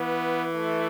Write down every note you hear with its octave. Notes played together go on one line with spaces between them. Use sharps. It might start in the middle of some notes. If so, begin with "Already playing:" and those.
Already playing: E3 B3
A3